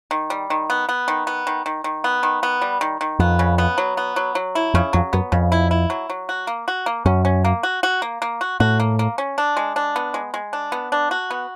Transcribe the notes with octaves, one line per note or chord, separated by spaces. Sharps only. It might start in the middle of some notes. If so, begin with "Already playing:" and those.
D#3
G3
D#3
B3
B3
D#3
B3
D#3
D#3
D#3
B3
D#3
B3
G3
D#3
D#3
F2 B3
C#3
B3
F#3
B3
F#3
F#3
E4
F2 C#3
F2 F#3
F#2 B3
F2 C#3
E4
E4
F#3
F#3
F#4
A#3
F#4
A#3
F#2 C#4
C#4
A#3
F#4
F#4
A#3
A#3
F#4
A2 F#4
A#3
A#3
C#4
D4
G#3
D4
B3
G#3
G#3
D4
B3
D4
F#4
B3